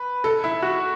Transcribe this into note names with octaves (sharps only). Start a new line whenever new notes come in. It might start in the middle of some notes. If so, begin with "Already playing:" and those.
Already playing: B4
A4
E4
F#4